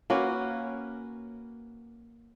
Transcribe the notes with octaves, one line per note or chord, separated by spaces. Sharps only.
A#3 C#4 F#4 B4